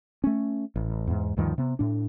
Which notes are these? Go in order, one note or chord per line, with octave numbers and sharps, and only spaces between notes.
A3 C#4
A1
E2 G#2
D2 G2 D#3 F3
C3 B3
A2 D4